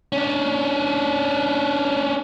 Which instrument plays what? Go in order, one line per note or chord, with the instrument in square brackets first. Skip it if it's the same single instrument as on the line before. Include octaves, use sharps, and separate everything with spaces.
[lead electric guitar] C#4 D4